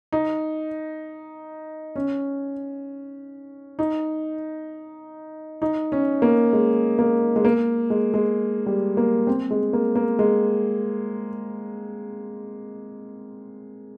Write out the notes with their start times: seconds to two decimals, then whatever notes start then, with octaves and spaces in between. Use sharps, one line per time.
0.12 D#4
1.96 C#4
3.79 D#4
5.62 D#4
5.92 C#4
6.22 A#3
6.53 G#3
6.99 A#3
7.36 G#3
7.45 A#3
7.90 G#3
8.14 G#3
8.66 G3
8.97 A#3
9.27 C4
9.51 G#3
9.73 A#3
9.95 A#3
10.19 G#3